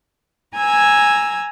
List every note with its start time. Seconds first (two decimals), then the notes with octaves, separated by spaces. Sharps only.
0.57 G#5 A#5 E6 G#6